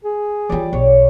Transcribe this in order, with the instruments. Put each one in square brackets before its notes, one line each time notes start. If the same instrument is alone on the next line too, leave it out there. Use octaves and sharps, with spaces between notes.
[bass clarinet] G#4
[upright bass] E3 F4 [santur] G3 D5
[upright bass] B1 [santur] C#5